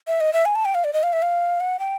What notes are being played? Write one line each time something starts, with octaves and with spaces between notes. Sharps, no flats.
E5
D#5
E5
G#5
A5
G5
F5
D5
D#5
F5
E5
F5
F#5
G5